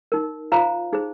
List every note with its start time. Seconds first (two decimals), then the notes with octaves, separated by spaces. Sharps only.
0.12 D#4 A#4
0.52 F4 C5 F5 A#5
0.93 D#4 G#4 C5